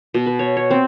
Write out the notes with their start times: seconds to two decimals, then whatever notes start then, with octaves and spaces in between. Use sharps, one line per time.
0.14 B2
0.26 B4
0.39 C#5
0.57 C#5
0.71 C4